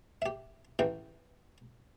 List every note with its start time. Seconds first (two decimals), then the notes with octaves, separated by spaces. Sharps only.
0.22 G4 E5
0.79 A1 E3 G5